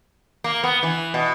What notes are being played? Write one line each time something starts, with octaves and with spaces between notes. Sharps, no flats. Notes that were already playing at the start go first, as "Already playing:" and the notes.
A#3
B3
E3
B2